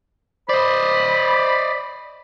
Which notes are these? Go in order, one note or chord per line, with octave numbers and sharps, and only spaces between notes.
C5 D5 D#5 B5